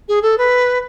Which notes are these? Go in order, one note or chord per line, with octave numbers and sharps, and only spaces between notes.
G#4
A4
B4